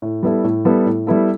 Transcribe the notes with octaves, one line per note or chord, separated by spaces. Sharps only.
A2
G3 B3 E4 A4
A2
G3 B3 E4 A4
A2
G3 B3 E4 A4